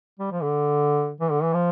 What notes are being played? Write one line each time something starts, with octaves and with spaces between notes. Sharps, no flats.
G3
F3
D3
E3
D3
E3
F3